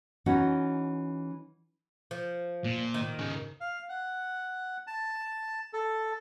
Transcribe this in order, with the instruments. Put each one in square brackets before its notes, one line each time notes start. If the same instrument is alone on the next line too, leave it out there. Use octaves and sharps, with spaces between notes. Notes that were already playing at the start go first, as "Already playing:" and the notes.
[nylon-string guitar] E3 C#4 D#4 F#4
[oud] F3
[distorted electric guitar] A#2
[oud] D#3
[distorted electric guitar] G#2 C#3
[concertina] F5
F#5
A5
A4